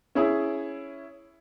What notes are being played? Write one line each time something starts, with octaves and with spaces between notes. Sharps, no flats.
C#4 E4 G#4